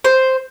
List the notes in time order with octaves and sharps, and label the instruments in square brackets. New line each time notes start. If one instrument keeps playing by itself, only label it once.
[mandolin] C5